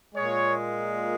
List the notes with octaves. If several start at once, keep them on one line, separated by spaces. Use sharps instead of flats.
A#2 G#3 C#5